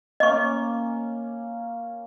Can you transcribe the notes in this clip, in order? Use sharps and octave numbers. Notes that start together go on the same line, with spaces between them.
A#3 C#4 D#5 C#6